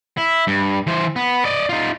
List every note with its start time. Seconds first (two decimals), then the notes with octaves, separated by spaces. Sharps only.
0.17 E4
0.47 G2
0.87 E3 C5
1.16 B3
1.45 D5 D#5
1.69 D#4 F4